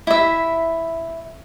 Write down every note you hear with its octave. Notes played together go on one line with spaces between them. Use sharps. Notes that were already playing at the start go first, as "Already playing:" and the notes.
E4 E5